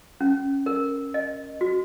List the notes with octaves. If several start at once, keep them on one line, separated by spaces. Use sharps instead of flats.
C#4
A#4
D#5
F#4